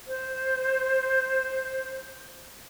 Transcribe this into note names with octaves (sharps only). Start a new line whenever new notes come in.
C5